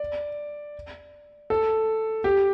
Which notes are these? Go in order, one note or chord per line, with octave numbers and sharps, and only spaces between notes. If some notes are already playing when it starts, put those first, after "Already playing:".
Already playing: D5
A4
G4